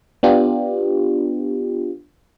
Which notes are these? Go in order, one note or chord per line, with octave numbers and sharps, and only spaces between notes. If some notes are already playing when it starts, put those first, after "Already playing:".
B3 D4 F4 G4